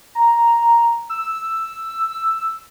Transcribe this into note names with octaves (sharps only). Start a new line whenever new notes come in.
A#5
E6